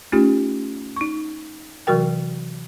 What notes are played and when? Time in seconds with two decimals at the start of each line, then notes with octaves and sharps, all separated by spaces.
0.12 A3 C#4 D#4 F4 G4
0.96 D#4 C#6
1.87 C3 E3 F#3 F#4 A#4 G5